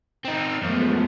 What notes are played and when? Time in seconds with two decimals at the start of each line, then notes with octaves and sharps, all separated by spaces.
0.25 C4 D#4 E6 F6
0.62 F#2 F3 G#3 A3 B3